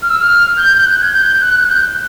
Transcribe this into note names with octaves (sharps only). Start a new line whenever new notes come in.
F6
E6
F6
G6
G6
F#6
G#6
G6
F#6
F#6
G6